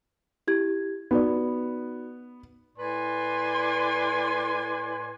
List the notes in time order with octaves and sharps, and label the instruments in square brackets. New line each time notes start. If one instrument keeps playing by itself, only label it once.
[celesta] E4 G4 G#6
[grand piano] B3 [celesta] D#4 F#4 D5
[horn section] A2 B4 D5 G#5 C6